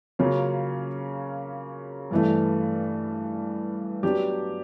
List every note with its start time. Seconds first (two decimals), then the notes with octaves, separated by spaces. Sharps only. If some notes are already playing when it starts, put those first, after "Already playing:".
0.19 C#3 F#3 A#3 C#4 F4
2.11 G2 E3 A3
4.03 F#3 B3 D4 G4